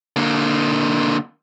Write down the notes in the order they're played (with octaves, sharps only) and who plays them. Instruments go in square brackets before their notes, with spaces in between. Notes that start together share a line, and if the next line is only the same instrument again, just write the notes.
[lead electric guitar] D3 A#3